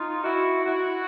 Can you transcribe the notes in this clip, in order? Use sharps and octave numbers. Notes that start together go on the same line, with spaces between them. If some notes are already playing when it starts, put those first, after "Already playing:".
Already playing: D#4 F4
E4 F#4
E4 F#4